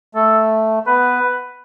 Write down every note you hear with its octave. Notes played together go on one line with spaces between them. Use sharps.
A3 A4
B3 B4